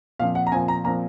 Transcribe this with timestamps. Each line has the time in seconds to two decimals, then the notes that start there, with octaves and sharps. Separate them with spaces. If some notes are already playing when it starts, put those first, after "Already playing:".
0.19 A#2 F3 C4 F5
0.35 F#5
0.47 A#5
0.52 A#2 F3 C4 G#5
0.68 A#5
0.84 A#2 F3 C4 A#5